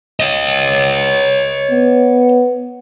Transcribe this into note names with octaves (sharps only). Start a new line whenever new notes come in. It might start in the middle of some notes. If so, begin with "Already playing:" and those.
C#5 D#5
B3